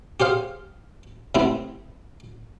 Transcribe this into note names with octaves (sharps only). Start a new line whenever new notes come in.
G4 G#4 C5 F5
C3 A3 B3 C4 E4